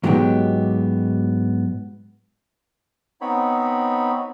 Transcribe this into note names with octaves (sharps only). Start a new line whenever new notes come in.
G#2 F#3 G#3 B3 E4 G4
B3 C4 D#4 C#5 B5